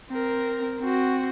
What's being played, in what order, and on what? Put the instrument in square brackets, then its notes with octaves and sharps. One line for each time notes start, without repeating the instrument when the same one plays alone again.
[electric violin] C4 A#4
C4 F#4